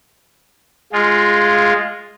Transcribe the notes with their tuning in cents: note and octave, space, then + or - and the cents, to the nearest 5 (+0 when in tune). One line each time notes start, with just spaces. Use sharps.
G#3 -5 F4 +0